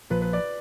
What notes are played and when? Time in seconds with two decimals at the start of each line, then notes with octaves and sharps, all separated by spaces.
0.10 A#1 A#2 F3 B4
0.22 B4
0.33 D5